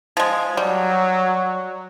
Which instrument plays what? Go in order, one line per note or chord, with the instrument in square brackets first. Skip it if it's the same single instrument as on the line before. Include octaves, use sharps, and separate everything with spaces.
[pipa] F3 G#3
[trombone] F#3 [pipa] G3